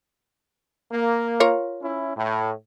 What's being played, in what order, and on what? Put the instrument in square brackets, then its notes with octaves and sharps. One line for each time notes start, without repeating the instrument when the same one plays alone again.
[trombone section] A#3
[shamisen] F4 A#4 C#5
[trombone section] C#4 E4
A2